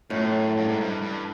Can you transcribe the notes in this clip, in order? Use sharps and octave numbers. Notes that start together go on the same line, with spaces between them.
F#2 A2
G2
G#2
G2
G2